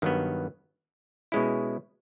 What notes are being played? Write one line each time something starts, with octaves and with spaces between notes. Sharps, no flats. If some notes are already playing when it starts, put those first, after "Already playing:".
G2 D#3 F#3 B3
B2 G#3 C#4 E4